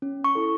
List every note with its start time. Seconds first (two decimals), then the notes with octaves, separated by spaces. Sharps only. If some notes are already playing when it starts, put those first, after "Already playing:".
0.02 C#4
0.24 C#6
0.35 E4 A4